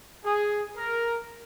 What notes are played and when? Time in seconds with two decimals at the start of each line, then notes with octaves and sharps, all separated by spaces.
0.24 G#4
0.77 A#4